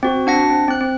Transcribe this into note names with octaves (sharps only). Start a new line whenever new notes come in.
C4 F#4
D4 F#5 A#6
C4
C4 F#6
C4